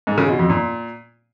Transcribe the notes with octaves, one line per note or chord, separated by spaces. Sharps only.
G#2
C#3
B2
F2
A#2